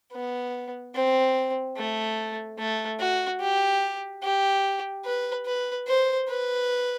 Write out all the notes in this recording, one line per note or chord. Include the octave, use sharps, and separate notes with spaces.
B3
C4
A3
A3
F#4
G4
G4
B4
B4
C5
B4